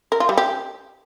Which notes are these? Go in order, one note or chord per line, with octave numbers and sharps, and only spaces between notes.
A#4
F4
G3
G4